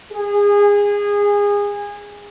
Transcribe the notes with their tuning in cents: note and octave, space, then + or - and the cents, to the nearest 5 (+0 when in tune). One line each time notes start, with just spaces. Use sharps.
G#4 -25